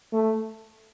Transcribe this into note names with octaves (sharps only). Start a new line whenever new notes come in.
A3